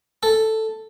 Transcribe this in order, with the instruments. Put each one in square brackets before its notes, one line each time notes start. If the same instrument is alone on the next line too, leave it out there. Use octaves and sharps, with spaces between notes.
[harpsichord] A4